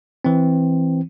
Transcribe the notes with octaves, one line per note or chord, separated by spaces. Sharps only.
E3 C4